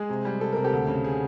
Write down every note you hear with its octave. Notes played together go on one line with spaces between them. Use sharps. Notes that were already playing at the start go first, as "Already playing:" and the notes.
Already playing: G#3 G#4
C3
G3
C3 A4
C3 A#4
G4 A4
D2
C#3
G#4